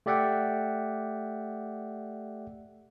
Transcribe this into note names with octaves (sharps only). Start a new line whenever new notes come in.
A3 G4 D5 E5 F#5 G5